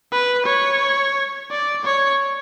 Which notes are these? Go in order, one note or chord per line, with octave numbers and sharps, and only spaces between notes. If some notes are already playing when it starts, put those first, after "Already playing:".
B4
C#5
D5
C#5